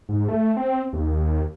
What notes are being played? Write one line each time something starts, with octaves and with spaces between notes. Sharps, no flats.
G#2
A3
C4
D#2